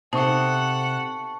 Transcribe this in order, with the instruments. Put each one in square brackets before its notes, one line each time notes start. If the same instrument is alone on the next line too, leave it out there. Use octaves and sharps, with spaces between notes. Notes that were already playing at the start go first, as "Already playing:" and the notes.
[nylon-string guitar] C3 [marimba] D#4 C5 [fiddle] A4 F#5 [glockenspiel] A5 C#6